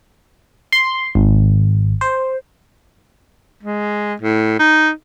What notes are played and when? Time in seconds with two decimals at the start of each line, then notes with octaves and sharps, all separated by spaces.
0.72 C6
1.15 G#1
2.01 C5
3.63 G#3
4.21 A2
4.59 D#4